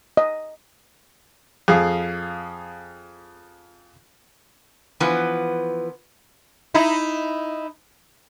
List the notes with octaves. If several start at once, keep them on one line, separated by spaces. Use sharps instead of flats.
D#5
F2 G#4 F5
E3 F3 B3 B4
D#4 E4